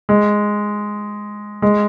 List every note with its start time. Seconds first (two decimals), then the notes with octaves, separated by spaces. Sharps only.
0.09 G#3
1.62 G#3